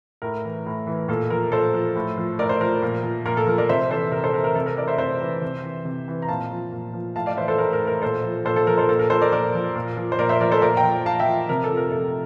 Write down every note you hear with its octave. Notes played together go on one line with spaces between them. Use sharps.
A2 A#4
E3
A2
E3
A#2 A4
F3 A#4
A#2 A4 C5
F3
A2
F3
A2 A#4 D5
C5
F3 A#4
A#2
F3
A#2 A#4
A4
F3 A#4
A#4 D5
C3 C5 E5
E3 A4 C5
C3 A#4
A4 C5
E3 A#4
A#4
C3 A4
A#4
E3 A#4 D5
C5 E5
C3 C5 E5
E3
C3
E3
C3
E3
A#5
A#2 F5 A5
F3
A#2
F3
A2 F5 A5
D5 F5
E3 C5 E5
A4 C5
A2 A#4
A#4
E3
A#4
A#2 A4 C5
F3
A#2 A4 C5
A4
F3 A#4
A4 C5
A#2 A4
A#4
F3 A4 C5
A#4 D5
A#2 A#4 D5
F3
A#2
F3
C5
A#2 A#4 D5
C5 E5
F3 A#4 D5
A4 C5
A#2 A#4 D5
G5 A#5
F3
A#2 F5 A5
E5 G5
F3
C3 A#4
A4
F3
A#4
C3 A4